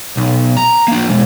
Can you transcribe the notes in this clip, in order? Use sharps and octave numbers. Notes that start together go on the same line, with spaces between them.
B1
A#5
A#3 D4
B2 G#3